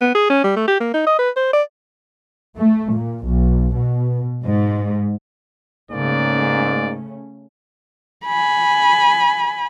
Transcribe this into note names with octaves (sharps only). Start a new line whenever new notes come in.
B3
G#4
C#4
G3
A3
G4
A#3
D#4
D#5
B4
C5
D5
A3
A#2
B1
B2
G#2
G#2 C#3 A3 A#3 C#4 D5
G#5 B5